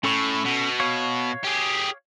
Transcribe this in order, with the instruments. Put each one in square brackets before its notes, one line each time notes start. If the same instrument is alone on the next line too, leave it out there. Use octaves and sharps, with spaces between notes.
[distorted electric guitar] A2 [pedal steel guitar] C#4 A4 C#6
[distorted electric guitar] B2
[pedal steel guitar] C#5 F5 C#6
[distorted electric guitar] G4 G#4